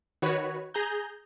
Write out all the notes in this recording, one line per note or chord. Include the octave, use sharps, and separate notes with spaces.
D#3 F#4 B4 C#5
G#4 A#5 G6